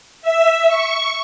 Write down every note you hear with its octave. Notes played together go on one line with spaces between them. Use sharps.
E5
C#6